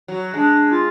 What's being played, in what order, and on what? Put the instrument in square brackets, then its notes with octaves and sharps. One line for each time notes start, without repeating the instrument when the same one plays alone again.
[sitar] F#3
[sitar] G#3 [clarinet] D4
[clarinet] F4